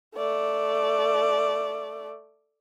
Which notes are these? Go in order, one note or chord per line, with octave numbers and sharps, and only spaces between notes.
A3 D5